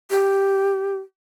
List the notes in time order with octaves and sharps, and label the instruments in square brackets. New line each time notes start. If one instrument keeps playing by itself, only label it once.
[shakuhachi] G4